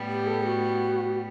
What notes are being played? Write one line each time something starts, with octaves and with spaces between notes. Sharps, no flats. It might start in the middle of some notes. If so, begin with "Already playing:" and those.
Already playing: A2 G3 B3
G4
A4
F#4